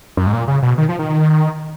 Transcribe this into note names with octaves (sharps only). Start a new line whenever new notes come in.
F#2
G#2
A#2
C#3
B2
D#3
F3
D#3